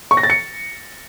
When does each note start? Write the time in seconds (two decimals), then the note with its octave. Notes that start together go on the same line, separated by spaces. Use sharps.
0.11 C#6
0.17 A#6
0.23 A6
0.30 C#7